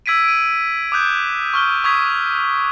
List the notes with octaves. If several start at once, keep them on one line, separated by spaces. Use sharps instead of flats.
E6 G#6 B6 D7 D#7
D7 D#7
D6 D#6 F#6 G6
C#6 F6 G7
C#6 D#6 G#6 B6